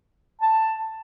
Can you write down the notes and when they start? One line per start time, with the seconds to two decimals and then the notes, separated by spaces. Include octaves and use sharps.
0.41 A5